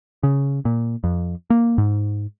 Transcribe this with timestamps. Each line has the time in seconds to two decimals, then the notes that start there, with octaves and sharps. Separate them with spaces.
0.23 C#3
0.65 A#2
1.04 F2
1.50 A#3
1.78 G#2